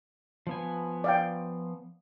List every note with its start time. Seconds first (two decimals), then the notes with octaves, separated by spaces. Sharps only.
0.47 F3 B3 G#5
1.04 D5 F5 G5